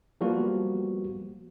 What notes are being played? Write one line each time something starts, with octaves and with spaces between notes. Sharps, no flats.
F3 G3 A#3 B3 F#4 G4